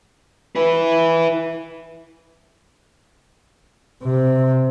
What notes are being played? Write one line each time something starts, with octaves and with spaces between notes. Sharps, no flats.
E4 B4
C3